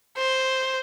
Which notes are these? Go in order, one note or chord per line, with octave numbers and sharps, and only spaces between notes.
C5